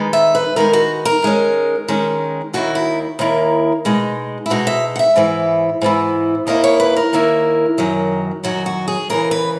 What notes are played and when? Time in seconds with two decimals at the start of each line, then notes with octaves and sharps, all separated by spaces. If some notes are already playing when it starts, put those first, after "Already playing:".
Already playing: D#3 G#3 B3 D#4
0.13 E5
0.35 B4
0.56 D#3 G#3 B3 D#4 A#4
0.73 F#4
1.05 A#4
1.22 D#3 G#3 C#4
1.88 D#3 G#3 C#4
2.53 D#2 D#3 A#3 E4 F#4
2.75 E4
3.19 D#2 D#3 A#3 E4
3.85 B2 G#3 D#4
4.46 E4
4.50 B2 G#3 D#4 F#4
4.67 E5
4.96 F#5
4.99 E5
5.16 G#2 E3 B3 E4
5.81 G#2 E3 B3 E4
6.47 D#2 D#3 A#3 E4 D#5
6.64 C#5
6.80 B4
6.96 A#4
7.13 D#2 D#3 A#3 E4
7.78 F#2 D#3 F#3
8.44 F#2 D#3 F#3 F#4
8.66 F#4
8.88 G#4
9.10 D#2 C#3 E3 A#4
9.31 B4